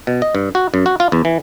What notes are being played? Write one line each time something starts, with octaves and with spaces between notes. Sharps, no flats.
B2
D#5
G2
F#4
F#2
F#4
F4
E2
E3